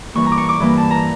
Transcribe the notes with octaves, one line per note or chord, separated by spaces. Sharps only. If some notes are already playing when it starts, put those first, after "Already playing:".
G2 E3 A#3 C#6
A#5
D6
C#6
D6
G2 E3 A#3
A5
A#5